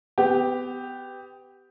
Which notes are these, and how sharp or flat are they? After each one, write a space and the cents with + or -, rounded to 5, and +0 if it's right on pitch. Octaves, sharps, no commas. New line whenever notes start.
B3 +25 G4 +0